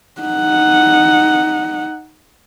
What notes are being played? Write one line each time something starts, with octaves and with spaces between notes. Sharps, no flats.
D#4 F#5